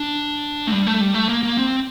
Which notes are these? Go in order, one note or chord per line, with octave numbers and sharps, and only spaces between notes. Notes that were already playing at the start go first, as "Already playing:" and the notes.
Already playing: D4
A3
G3
A3
G3
A3
A#3
A#3
C4